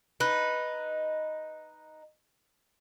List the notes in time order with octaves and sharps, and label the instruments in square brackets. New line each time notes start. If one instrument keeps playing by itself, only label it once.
[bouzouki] D#4 B4